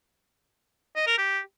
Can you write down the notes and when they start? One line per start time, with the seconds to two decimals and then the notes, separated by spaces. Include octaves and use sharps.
0.96 D#5
1.07 A#4
1.18 G4